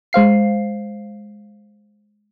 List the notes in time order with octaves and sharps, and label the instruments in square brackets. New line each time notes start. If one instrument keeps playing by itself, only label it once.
[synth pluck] G#3 C5 F5 C7